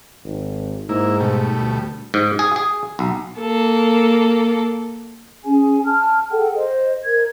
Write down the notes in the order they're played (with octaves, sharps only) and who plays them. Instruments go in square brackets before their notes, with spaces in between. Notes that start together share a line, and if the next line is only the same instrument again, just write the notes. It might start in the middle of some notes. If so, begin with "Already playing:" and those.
[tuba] G#1
[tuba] G#2 [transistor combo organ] A#3 E4
[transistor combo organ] B2 G3 A3
[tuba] D2
[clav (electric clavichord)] G#2
G#4
G#4
B1
[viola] A#3 A4
[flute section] C#4 G#4 G#5
A5 F6
G#4 A4 F#5 G5
C5 D#5
A#4 G#6